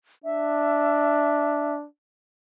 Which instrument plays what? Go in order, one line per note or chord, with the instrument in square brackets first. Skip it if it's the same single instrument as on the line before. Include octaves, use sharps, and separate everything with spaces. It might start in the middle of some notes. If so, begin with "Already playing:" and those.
[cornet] D4 [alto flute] E5